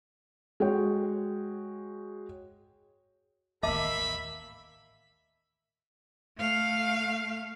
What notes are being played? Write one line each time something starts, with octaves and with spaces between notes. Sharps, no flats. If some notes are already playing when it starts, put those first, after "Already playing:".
G#3 F#4 C#5 G5
A1 D#2 A#3 D#5 E5 A5 B5 D6
A3 F5